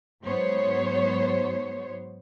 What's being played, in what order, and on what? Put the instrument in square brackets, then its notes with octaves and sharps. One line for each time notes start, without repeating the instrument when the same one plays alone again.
[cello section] G#2 F#3 B3 C5 C#5